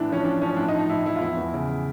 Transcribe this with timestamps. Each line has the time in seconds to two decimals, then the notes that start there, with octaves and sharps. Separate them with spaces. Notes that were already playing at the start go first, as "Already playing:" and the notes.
Already playing: A2 E3 D4
0.09 F3 C#4
0.24 F3 D4
0.42 F3 C#4
0.57 A2 D4
0.68 D#4
0.73 F3
0.79 D#4
0.89 A2 E4
1.06 F3 E4
1.16 F4
1.21 E2 E4
1.37 E2
1.54 C#3